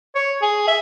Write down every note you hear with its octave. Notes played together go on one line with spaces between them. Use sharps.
C#5
G#4
E5